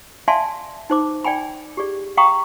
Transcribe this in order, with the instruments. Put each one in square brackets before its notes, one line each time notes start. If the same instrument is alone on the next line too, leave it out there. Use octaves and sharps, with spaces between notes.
[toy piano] D5 E5 F5 G#5 A5 C6
D#4 C5 D6
D5 G5 G#5 B5
G4 G#4 D5
F5 G5 A#5 B5 C#6 D#6